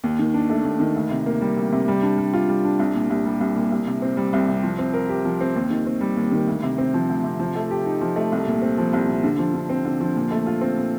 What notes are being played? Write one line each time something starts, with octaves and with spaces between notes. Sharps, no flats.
D#2
D#3
D4
A3
D#2
D#3
D2
C3
A#3
G3
D2
C3
G3
D4
G3
F4
G3
D4
C2
A#2
C2
G3
C2
A#2
C2
C3
C4
G3
C2
C3
F3
C4
A#4
G4
F3
C4
D#2
D#3
C4
G3
D#2
D#3
D2
C3
C4
F3
D2
C3
F3
A3
G4
D#4
F3
A3
C2
A#2
C4
F3
C2
A#2
D3
F3
D3
C4
D3
F3
A#2
A3
F4
C4
A#2